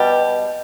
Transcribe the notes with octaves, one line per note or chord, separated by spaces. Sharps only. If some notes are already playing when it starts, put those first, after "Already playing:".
Already playing: B2 G3 G4